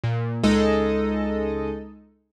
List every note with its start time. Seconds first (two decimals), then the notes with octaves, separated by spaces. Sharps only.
0.04 A#2
0.43 C#2 G#3 D#4 A4 D#5